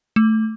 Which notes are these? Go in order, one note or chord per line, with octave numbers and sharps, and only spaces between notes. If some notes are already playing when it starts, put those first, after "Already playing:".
A3